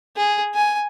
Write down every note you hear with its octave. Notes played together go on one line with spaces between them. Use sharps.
G#4
G#5